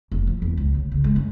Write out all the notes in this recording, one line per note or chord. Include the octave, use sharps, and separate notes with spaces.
F1
F3
E2
C#2
D2
C#3
G#3
F#2